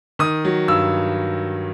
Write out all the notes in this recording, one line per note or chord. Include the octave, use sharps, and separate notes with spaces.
D#3 D#6
F#3
G2 E6